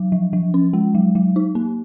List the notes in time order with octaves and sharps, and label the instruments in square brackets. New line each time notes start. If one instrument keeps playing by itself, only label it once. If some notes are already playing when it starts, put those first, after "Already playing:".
Already playing: [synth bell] F#3
F3
F3
C#4
G#3
F#3
F#3
D#4
A#3